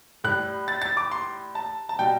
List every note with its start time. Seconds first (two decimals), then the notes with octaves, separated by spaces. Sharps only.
0.24 A2 G3 F#6
0.68 A6
0.82 A6
0.97 D6
1.11 C6
1.55 A5
1.89 A5
1.99 B2 G3 G5